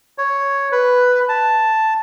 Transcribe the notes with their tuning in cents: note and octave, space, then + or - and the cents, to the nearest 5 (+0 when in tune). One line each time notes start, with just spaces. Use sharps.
C#5 +0
B4 +5
A5 +0